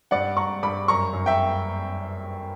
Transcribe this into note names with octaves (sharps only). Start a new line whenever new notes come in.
G2 D5 F#5
G2 A#5 C#6
G2 B5 D6
F#2 A#5 C#6
F#2
E5 G5